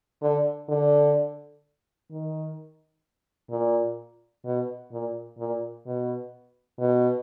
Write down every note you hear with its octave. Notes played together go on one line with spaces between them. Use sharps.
D3
D3
D#3
A#2
B2
A#2
A#2
B2
B2